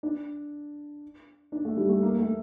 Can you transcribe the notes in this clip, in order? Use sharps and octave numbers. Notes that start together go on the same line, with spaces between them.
D4
D4
A3
G3
A3
A#3
A3